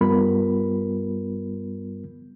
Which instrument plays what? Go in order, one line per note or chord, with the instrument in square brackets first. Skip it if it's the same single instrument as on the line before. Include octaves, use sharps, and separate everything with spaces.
[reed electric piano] G2 G3 B3 F4 A#4 B5